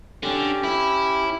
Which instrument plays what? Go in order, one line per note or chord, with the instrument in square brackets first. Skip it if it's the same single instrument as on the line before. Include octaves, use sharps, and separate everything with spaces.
[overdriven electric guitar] D3 [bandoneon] C#4 G4
[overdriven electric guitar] E4